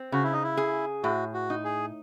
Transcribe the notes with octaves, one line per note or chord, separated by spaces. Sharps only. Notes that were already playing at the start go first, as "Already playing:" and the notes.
Already playing: C4
C#3 F#4
E4
D#4
E4
G#4
A2 F#4
F#4
D#4
G#4